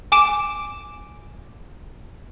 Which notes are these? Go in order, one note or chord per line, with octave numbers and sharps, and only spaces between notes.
G#5 D6 D7 E7